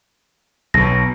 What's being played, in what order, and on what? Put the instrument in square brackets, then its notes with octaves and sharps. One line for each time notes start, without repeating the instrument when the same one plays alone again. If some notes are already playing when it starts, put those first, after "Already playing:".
[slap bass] B1 B2 [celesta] A#6